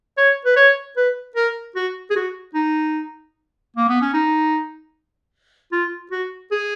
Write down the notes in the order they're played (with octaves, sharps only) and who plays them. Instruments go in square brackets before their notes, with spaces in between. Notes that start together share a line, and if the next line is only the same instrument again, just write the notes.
[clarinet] C#5
B4
C#5
B4
A#4
F#4
G#4
F#4
D#4
A#3
B3
C#4
D#4
F4
F#4
G#4